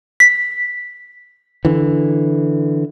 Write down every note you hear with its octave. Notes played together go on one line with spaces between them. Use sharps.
B6
D3 E3